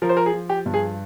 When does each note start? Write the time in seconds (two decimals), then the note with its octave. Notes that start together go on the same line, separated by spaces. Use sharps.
0.02 F3 A#4
0.09 C5
0.17 A#4
0.26 G#4
0.33 F3
0.49 G4
0.66 G2
0.74 G#4